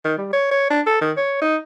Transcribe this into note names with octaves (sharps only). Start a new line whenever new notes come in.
D#3
G3
C#5
C#5
D4
A4
D#3
C#5
D#4